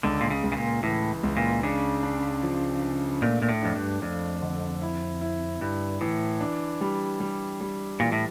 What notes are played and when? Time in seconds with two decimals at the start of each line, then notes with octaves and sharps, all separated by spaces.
0.03 C#2 D3
0.21 A#2
0.30 C#3
0.44 C#2
0.52 C#3
0.57 A#2
0.83 A2 E3
1.23 C#2
1.37 A#2
1.63 C#3 D4
2.03 D4
2.43 F3
2.82 D4
3.22 A#2 A3
3.42 A#2
3.49 A2
3.62 F2 D4
3.76 G2
4.02 F2 D4
4.42 D3
4.82 E4
5.21 E4
5.61 G2 E4
6.01 A2 E3
6.41 D4
6.81 G3
7.20 G3
7.61 G3
8.00 A#2 E3
8.12 A2